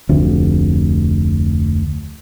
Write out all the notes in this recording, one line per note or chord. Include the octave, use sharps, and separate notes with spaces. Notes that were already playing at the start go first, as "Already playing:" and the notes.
F1 D2